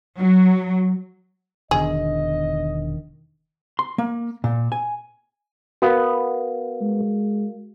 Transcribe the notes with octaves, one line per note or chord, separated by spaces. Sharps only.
F#3
E1 B2 D3 D#3 G#4 D#5
C6
A#3
A#2
G#5
B3 F#4 A#4 F5
G#3